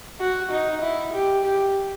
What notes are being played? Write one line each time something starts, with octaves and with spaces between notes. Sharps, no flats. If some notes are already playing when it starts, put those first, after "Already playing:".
F#4
D#4
E4
G4
G4